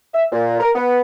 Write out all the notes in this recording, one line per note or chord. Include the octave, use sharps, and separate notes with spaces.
E5
A#2
A#4
B3